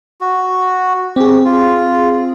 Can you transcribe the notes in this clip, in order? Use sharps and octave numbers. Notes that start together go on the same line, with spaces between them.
F#4
C4 G4 G#4
F4